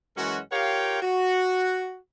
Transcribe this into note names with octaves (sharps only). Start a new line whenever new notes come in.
F#2 E3 G#3 C#4 F#4
F4 G4 A#4 C#5 F5 G5
F#4